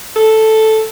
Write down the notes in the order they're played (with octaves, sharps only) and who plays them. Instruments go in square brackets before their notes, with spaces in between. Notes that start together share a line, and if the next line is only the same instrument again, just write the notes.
[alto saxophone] A4